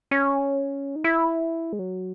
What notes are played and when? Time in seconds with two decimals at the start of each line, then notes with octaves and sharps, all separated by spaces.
0.11 C#4
0.96 D#4
1.04 E4
1.73 G#3
1.79 F#3